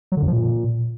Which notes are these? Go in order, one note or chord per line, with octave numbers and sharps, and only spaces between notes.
F#3
D3
F#2
F3
A#2